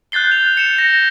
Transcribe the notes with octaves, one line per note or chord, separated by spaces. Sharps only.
F#6 G6 A6 C7 G7
F7
C#7 E7
A#6